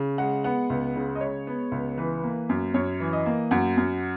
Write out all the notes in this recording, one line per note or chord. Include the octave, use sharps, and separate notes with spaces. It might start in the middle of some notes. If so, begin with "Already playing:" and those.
Already playing: C#3
G#3 F#5
B3 F#5
C#2
C#3
D#5
G#3 C#5
B3
C#2
E3 B4
A#3
F#2
F#2 C#5
E3
D#5
A#3
F#2 F#5
F#2